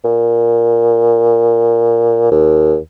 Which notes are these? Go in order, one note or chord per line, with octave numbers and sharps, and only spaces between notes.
A#2
D#2